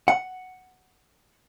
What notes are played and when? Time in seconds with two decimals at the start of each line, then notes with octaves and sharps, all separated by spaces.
0.08 F#5